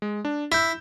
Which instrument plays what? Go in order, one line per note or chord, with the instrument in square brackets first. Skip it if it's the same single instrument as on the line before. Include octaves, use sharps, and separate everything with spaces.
[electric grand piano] G#3
D4
[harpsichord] E4 [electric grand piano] E6 G6